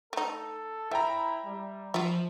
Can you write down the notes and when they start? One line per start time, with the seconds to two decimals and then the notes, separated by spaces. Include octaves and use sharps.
0.13 A3 D#4 A4
0.91 F3 E4 E5 G5 A#5
1.45 G3
1.94 F3 F4 E5